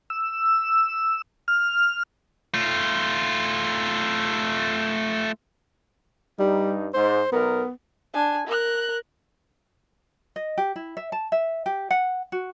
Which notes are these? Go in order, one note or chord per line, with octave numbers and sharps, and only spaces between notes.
E6
F6
A3 F4
G2 G3 D#4
G#2 C5
B1 B3 A#4
D4 G#5
A#4 F#6
D#5
G4
E4
E5
A5
E5
G4
F#5
F#4